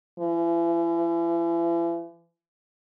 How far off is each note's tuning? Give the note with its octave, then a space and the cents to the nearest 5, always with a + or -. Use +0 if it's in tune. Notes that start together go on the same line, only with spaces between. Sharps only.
E3 +40